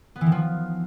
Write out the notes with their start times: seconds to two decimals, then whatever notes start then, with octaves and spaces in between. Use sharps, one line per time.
0.16 B3
0.21 E3
0.26 D#3
0.32 F3